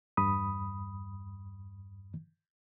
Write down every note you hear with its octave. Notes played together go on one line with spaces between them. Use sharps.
E2 G2 B5 D#6